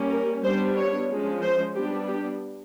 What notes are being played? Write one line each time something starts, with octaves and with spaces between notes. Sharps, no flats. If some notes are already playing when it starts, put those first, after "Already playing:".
Already playing: G3 A#3 C#4
A#4
G3 B3 D4 C5
C#5
F3 G#3 C#4
C5
G3 B3 D4 G4
G4